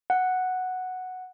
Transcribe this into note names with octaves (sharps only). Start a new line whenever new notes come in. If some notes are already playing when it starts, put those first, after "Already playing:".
F#5